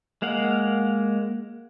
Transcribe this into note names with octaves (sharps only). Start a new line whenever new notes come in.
G#3 A#3 F5 F#5